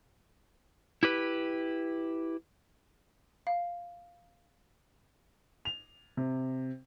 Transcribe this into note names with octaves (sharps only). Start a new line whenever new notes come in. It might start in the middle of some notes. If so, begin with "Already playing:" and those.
E4 G4 B4
F5
F7
C3